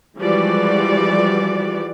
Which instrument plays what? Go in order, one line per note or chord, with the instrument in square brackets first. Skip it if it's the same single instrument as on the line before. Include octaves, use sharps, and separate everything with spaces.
[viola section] E3 F3 G3 G#3 F#4 D5